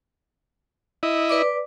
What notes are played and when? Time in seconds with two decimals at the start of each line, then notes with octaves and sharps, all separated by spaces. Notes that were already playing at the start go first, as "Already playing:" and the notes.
1.03 E4 D#5
1.29 B4 D5 D6